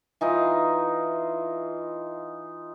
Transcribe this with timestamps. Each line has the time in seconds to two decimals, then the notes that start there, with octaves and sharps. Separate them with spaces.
0.21 E3 D#4 F4